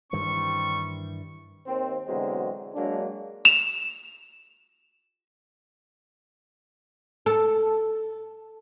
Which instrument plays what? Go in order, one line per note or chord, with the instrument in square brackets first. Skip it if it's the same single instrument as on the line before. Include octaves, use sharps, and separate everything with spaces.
[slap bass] G2 D#3 E3 [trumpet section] G3 C4 C#6
[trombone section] D#2 C4
B2 D3 E3 F#3 G#3 C4
F#3 G#3 A#3 D4
[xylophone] E7 F7
[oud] A4